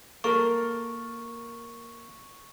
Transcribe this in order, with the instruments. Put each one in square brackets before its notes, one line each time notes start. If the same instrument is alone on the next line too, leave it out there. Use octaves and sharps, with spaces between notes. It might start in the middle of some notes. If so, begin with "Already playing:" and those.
[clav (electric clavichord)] A#3 [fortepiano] A4 A#4 [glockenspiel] C#6